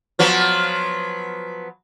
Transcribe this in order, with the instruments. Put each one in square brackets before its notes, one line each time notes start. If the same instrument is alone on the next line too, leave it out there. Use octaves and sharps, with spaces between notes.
[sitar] F3 F#3 B3